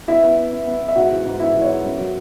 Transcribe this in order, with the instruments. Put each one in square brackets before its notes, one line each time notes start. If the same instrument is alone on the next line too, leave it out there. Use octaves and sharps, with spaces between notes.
[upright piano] B3 E4 E5
B3
B3
B3
B3
B3
E5
G#2 F#4 F#5
E3
G#2
B3 E4 E5
E3
C#5
B3
F#2
F#3